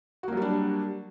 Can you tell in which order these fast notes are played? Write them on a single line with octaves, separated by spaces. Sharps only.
F#4 A#3 F#3 G3 D4